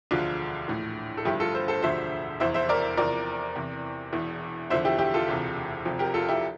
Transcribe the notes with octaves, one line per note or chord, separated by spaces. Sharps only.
E1 D2 D3 F3 D4 F4
A#1 A2 E3
A4
G1 G2 F3 E4 G4
F4 A4
A4 C5
A4 C5
E1 D2 D3 F3 C5 E5
F1 E2 E3 C5 E5
C5 E5
A#4 D5
E2 C3 F3 A#4 D5
E2 C3 E3
E1 E2 E3
E1 E2 D3 F3 C5 E5
E4 G4
E4 G4
F4 A4
E1 D2 C3 E3
F1 F2 C3 F3
G4 A#4
F4 A4
E4 G4